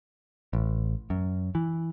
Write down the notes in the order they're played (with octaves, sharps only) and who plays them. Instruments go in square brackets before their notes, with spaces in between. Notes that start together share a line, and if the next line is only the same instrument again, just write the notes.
[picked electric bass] A1
F#2
E3